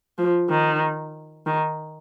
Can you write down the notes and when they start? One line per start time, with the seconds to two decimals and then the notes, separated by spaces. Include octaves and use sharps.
0.18 F3
0.50 D#3
1.46 D#3